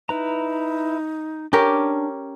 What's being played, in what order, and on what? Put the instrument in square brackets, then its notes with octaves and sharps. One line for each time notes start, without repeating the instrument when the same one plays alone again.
[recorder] D#4 [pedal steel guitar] E4 B4 A#5
[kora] C#4 G4 A#4 [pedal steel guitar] D4 D6